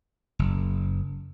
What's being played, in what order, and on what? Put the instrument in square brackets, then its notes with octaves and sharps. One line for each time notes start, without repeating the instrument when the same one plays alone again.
[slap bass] F#1